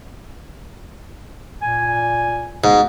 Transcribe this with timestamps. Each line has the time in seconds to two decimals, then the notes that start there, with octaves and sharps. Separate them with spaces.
1.61 A#2 G#5
2.64 D2 G#2 B3